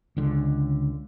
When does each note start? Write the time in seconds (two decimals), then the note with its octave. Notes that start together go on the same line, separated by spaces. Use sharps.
0.17 C#2 D3